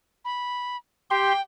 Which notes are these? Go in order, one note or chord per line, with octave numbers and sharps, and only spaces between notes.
B5
G4 G5 C6